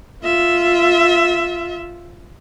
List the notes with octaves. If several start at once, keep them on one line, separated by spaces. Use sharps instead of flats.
F4 E5